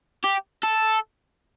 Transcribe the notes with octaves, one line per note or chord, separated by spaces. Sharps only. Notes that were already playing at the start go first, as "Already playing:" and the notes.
G4
A4